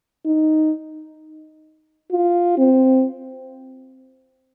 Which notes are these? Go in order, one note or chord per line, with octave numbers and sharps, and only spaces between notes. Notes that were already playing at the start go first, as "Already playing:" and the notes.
D#4
F4
C4